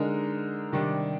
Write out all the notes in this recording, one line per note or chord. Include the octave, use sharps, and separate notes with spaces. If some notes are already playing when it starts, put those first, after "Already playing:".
Already playing: D3 G#3 D#4 A#4
C3 D#3 G3 D4